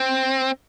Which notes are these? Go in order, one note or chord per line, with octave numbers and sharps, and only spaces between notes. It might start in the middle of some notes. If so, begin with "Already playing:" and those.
Already playing: C4